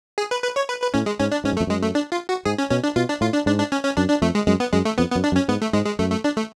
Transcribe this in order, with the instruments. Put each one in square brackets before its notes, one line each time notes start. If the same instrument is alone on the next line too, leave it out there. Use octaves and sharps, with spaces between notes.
[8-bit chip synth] G#4
B4
B4
C#5
B4
B4
[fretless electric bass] A2 [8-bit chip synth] C#4
[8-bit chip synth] G#3
[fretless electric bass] G#2 [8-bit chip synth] C#4
[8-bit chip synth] D4
[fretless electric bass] G#2 [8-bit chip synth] C#4
[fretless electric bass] F#2
[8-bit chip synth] A3
[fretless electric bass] F2
[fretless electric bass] F#2 [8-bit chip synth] G#3
[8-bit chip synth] A3
D4
F4
F#4
[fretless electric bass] G#2 [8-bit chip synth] G#4
[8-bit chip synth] C#4
[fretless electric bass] B2 [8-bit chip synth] C#4
[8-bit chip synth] D4
[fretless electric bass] B2 [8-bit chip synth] F4
[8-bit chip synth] D4
[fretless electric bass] A2 [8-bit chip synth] F4
[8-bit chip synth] D4
[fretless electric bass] G#2 [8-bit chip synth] D4
[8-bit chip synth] D4
C#4
C#4
[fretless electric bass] F#2 [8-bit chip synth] D4
[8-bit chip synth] D4
[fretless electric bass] F2 [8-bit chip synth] A3
[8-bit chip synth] G#3
[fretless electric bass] F#2 [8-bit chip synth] G#3
[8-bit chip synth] B3
[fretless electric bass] F#2 [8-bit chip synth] G#3
[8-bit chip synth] A3
[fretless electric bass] F2 [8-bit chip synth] B3
[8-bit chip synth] B3
[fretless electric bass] F#2
[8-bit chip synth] D4
[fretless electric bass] F#2
[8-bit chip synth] C#4
[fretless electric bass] G#2 [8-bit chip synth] B3
[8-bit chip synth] A3
[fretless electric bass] G#2 [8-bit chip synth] G#3
[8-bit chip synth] G#3
[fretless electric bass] F#2 [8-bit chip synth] A3
[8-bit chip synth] A3
D4
A3